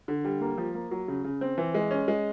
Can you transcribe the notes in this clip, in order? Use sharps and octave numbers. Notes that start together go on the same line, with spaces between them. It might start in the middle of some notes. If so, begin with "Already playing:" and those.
D3
G3
A#3
F3
A#3
F#3
C#3
C#3
C4
E3
G#3
C#4
G#3